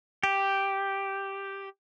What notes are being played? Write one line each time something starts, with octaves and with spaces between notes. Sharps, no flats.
G4